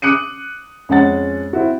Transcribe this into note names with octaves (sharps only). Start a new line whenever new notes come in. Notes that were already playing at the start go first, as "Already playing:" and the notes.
D6 D#6 F#6 C#7 D#7
F2 G#3 C#4 F#5 A6
C4 E4 F#4